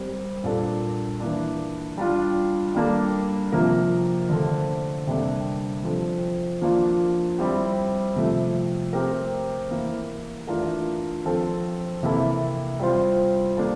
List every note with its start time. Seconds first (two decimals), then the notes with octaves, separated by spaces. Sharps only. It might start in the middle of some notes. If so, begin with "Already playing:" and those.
Already playing: G3 C4 G4 A#4
0.44 A#2 G3 A#3 D4 A4
1.20 E3 A#3 D4
1.97 G3 D4 F4
2.75 G3 A#3 D4 A4
3.52 C3 F3 A#3 F4 A#4
4.29 D3 A3 D4 A4 C5
5.07 C3 G3 A#3 D4 A4
5.84 F3 C4 F4 A4
6.61 F3 A#3 D4 F4
7.38 G3 C4 E4 G4
8.16 C3 F3 A3
8.93 A3 C4 G4 A#4
9.71 E3 A#3 E4
10.47 E3 A3 D4 F4 A#4
11.25 F3 C4 F4 A4 C5
12.03 C3 E3 A#3 E4 A4
12.79 G3 C4 F4 C5
13.57 A#3 D4 A4